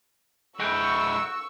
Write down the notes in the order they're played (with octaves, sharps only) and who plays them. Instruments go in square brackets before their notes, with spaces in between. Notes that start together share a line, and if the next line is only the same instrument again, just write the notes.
[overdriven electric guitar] G#3 E4 [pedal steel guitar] F#4 G5 [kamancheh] C#6 E6